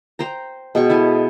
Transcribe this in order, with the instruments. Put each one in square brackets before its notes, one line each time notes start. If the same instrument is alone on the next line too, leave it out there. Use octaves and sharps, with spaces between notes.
[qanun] C5 G5 A#5
[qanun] B2 G5 C#6 [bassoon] G#3
[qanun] E4 A4 G#5